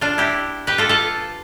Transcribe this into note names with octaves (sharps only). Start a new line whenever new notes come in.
D4 F4
E4 G4
G4 B4
F4 A4
F4 A4